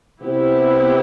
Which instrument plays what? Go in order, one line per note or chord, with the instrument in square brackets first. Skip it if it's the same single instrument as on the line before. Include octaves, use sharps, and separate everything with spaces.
[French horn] C3 [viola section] B3 E4 G4